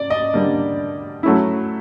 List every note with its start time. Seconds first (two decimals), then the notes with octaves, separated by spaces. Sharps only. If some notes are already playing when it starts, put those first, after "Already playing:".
Already playing: D5
0.10 D#5
0.34 D3 G3 A#3 D4
1.23 F#3 A3 C#4 E4